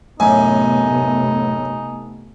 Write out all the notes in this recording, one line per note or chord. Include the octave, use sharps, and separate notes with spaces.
F#2 A2 C3 A3 B3 D#4 G#5